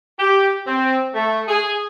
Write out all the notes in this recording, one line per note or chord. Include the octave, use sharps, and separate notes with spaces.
G4
C4
A3
G#4